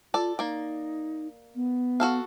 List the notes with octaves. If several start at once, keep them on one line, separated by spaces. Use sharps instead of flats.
F4 A4 D5
A#3 D#4 D5
B3
F#4 A4 F5